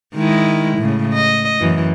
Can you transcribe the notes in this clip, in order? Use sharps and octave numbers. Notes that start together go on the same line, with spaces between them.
D#3 G#3 E4
A2 C#3
D#5
F#2 E3